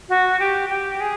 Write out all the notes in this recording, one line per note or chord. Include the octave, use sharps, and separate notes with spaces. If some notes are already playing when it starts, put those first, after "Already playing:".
F#4
G4
G4
G#4